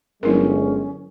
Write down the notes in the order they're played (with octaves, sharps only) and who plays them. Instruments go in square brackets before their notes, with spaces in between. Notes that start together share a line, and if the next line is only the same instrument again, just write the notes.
[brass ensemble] G1 G#3 [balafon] F#3 E4 A#4 [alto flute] C#4